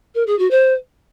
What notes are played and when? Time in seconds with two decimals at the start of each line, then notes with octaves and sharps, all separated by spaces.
0.15 A#4
0.26 G#4
0.38 F#4
0.50 C5